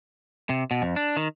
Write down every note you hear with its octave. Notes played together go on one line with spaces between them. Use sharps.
C3
B2
F2
D4
D#3